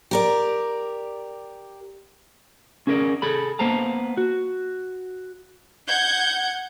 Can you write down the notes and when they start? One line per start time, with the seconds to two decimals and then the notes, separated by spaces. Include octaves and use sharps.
0.11 G4 A#4 D5
2.87 C#4 G#4 A#4 B4 D5
3.22 G#4 A4 B5
3.59 A#3 B3 C5 A5 A#5
4.17 F#4
5.87 F#5 G6 G#6